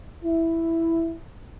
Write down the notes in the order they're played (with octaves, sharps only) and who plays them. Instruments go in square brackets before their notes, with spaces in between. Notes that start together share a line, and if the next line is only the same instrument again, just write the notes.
[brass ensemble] E4